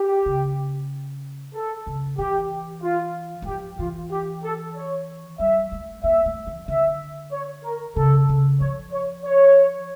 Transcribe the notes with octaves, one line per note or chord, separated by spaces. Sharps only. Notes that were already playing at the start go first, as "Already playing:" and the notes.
Already playing: G4
C#3
A4
C#3
E3 G4
F4
G3
F3 G4
E3 F4
G4
A4
C#5
G3 E5
A3
A#3 E5
A3
E3
D3 E5
C#5
A#4
C#3 A4
C#3
F3 C#5
C#5
C#5